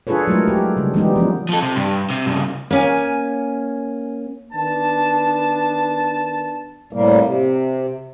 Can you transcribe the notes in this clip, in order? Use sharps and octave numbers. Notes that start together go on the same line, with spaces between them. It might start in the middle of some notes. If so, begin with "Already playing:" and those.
D4 F4 G#4 A4 B4 C#5
F#3 G#3 A3 E4 A#4
G4 A4
C#3 G3
E3 G3 G#3 B3 D#4 G4
F3 A#3 C#4
F3 A4
C3
G2
C3
G2 C#3
A#3 C#4 G#5
D#3 B3 D4 A5
A2 C3 G3 A#3
C3